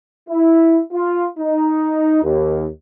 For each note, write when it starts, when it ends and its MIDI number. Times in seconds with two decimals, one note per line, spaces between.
0.29 0.79 64
0.93 1.25 65
1.38 2.20 63
2.23 2.66 39